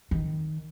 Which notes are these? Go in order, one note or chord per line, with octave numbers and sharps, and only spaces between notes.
D#3